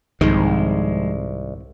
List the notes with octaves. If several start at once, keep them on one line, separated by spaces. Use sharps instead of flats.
C2 F2 G#2 D#3 G#3